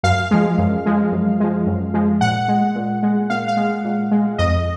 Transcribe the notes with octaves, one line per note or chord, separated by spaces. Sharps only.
F#2 F5
F3 G#3
F#2
F3 G#3
F#2
F3 G#3
F#2
F3 G#3
A#2 F#5
G#3
A#2
G#3
A#2 F5
F5
G#3
A#2
G#3
F2 D#5